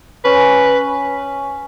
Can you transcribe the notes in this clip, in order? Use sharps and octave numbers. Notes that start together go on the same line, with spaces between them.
C#4 B4